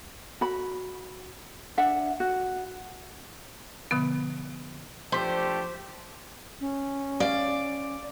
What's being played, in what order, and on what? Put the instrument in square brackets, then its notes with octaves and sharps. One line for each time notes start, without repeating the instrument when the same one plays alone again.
[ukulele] F#4 B5
D4 E5 F#5
F#4
[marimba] B2 D3 F3 B3
[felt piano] F3 C6 B6 [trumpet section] A3 D4 G4 [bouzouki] C5
[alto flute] C#4
[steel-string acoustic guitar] D5 [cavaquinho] F5